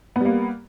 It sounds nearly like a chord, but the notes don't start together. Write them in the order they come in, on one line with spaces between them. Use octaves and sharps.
B3 G3 A#3